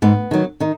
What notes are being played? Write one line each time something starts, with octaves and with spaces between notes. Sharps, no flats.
G#2 B3
D#3 F#3
D#3 D#4